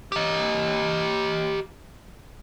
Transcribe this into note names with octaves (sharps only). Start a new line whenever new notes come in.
G4 D#5